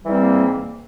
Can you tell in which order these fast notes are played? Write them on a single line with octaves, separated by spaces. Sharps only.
G3 E3 G#2 C4 A#3